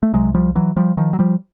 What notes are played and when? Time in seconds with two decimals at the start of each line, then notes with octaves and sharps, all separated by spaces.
0.03 A3
0.13 C2 C3 F#3 G#3
0.35 F3 G3
0.55 E3 F#3
0.77 F3 G3
0.97 D#3 F3
1.13 F#3
1.19 F3 G3